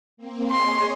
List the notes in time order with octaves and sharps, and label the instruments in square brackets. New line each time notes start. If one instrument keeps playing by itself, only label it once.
[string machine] A#3 C4
[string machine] G#4 C#5 D#5 [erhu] C6